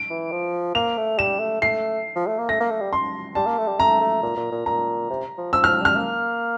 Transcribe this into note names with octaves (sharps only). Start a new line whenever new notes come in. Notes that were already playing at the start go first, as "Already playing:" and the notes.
Already playing: D7
E3
F3
A#3 F7
A3
G3 E7
A3
A3 C7
F3
A3
A#3
A3 A#6
A#3
A3
G3
C6
G3 A5
A#3
A3
G3
A3 A#5
A3
A#2
A#2
A#2
A#2 A#5
C3
F3
F3 E6
F3 F6
G3 F6
A#3